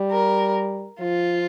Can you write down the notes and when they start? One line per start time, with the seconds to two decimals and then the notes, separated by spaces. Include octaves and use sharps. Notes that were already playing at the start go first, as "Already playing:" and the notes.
Already playing: G3
0.11 A#4
1.00 F3 F4